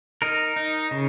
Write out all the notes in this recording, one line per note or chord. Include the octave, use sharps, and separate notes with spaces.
D#4 A#4
D#4
C#3